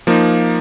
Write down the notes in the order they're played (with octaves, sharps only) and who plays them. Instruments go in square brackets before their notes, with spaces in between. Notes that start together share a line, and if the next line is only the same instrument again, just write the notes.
[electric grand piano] F3 A#3 D#4